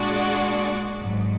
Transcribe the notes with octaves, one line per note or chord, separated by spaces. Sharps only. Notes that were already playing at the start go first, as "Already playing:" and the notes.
Already playing: A#2 G#3 D4 F#4 D5
G#1 G#2 F#3